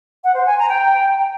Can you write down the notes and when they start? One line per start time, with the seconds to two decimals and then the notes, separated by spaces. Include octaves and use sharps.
0.23 F#5
0.34 C5
0.46 G#5
0.57 A#5
0.69 G5